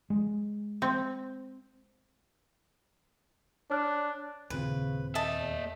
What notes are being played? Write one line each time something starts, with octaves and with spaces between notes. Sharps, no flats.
G#3
C4
D4 C#5 F6 F#6
D#2 A#2 C#3 C4 B4
A#3 D#5 E5 A5
E2